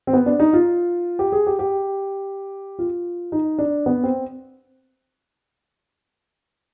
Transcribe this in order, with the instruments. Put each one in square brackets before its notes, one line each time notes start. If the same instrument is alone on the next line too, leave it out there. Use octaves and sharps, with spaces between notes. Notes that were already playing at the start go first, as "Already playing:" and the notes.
[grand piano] C4
B3
D4
D#4
F4
G4
G#4
G4
G4
F4
D#4
D4
B3
C4